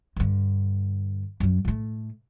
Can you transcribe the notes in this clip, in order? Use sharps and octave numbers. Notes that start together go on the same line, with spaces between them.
G2 D3
F#2 F#3
A2 A3